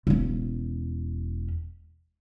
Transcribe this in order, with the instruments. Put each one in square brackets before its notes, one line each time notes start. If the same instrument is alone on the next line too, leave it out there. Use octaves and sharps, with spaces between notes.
[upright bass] E1 C#4